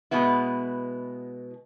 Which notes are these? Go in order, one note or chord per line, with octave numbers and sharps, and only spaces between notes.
B2 G#3 B3 E4